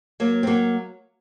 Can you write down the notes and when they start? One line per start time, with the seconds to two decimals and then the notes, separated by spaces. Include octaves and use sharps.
0.20 F#3 A#3
0.43 C4
0.47 F#3 A#3